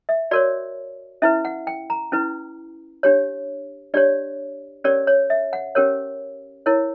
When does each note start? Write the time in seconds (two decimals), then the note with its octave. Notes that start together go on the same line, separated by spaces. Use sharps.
0.09 E5
0.31 F#4 A#4 C#5 D5
1.22 C#4 E4 B4 E5
1.45 F#5
1.67 G5
1.90 A#5
2.12 C#4 E4 B4
3.03 D4 G4 C#5
3.94 D4 G4 C#5 D5
4.84 C#4 G4 A#4 C#5 D5
5.07 C#5
5.30 E5
5.53 F#5
5.75 C#4 G4 A#4 C#5
6.66 E4 A#4 C#5